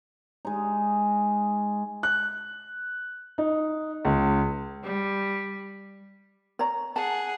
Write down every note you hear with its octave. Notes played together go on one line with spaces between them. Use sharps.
G#3 D#4
F#6
D#4
C#2
G3
C#5 A#5
G#4 F#5 A5